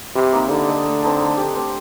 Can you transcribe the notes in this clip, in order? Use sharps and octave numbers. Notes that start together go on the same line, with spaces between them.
C3 G3
A#3 D#4
D3 D#4
A4 D#5
A3
C4 D#4 A4
A3
D4 G4
C4